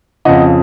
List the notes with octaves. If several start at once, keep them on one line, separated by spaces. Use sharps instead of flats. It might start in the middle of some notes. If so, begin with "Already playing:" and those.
F2 C#3 F3 D#5 F#5